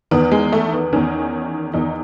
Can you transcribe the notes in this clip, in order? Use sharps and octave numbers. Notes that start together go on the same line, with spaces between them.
E2 D#3 B3
G#3
A3
B3
E2 D#3 C#4
E2 D#3 D#4